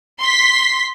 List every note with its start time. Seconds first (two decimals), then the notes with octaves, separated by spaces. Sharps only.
0.20 C6 B6